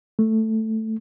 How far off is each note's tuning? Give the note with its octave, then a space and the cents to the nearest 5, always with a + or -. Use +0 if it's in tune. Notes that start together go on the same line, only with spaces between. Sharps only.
A3 +5